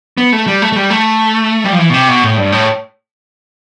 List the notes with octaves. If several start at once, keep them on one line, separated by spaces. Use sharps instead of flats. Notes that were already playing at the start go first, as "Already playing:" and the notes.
B3
A3
G3
A3
A3
G3
A3
G3
F3
E3
B2
C3
B2
A2
G2
A2